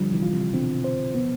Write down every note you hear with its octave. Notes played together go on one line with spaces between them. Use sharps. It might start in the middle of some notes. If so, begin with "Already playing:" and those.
Already playing: D3 F3 G3
C3 E3
F4
C3
B2 D3 C4
C5
B3